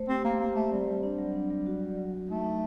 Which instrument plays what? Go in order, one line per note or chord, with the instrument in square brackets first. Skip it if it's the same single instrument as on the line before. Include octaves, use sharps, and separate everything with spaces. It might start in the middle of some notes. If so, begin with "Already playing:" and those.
Already playing: [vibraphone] A3 C5
[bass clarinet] C4 [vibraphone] G4
[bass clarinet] A#3 [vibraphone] C5
[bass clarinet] A#3 [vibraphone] G4
[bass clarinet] A3 [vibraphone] C4
[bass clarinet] G3 [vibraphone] C4
[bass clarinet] G3 [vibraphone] C4
[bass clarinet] G3 [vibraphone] D4
[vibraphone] F#3
D4
F#3
F#4
F#3
F#3
F#3
[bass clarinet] A3 [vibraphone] D#4
[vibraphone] D#4